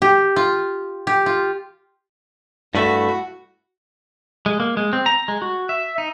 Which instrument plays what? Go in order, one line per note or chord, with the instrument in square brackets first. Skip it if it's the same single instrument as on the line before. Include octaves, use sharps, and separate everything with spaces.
[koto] G4
F4
G4
F4
[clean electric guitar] G2 A3 E5 [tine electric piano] E4 B5 [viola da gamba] F#4
[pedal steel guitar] G#3
A#3
G#3
C4
A#5
G#3
F#4
E5
D#4